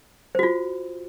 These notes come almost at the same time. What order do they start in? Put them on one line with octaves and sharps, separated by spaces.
C5 F#4 F4